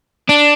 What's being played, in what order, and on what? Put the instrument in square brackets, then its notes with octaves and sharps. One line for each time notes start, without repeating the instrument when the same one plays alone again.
[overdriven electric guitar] D4